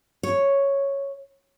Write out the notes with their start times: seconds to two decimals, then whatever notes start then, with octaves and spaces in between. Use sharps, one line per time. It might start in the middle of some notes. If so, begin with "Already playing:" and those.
0.23 C#5